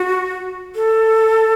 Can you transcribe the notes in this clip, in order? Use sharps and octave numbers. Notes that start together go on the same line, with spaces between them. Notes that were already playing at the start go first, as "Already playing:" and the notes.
Already playing: F#4
A4